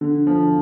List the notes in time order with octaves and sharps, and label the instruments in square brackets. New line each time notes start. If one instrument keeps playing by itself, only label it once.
[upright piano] D3
F3